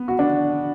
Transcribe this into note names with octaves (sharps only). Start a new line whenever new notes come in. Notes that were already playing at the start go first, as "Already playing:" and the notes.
Already playing: B3
F#4
D4